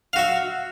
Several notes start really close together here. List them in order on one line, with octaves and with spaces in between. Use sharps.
F5 F#4 E5